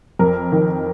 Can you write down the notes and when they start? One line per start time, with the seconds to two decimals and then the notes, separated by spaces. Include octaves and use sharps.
0.19 F2 A#4
0.52 D#3